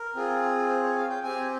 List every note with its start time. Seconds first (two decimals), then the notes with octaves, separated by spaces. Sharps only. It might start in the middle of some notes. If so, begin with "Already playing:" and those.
Already playing: A#4
0.15 C4 F4 G#4
0.69 C5
0.83 C#5
0.96 F5
1.10 G5
1.23 C4 G4 G#5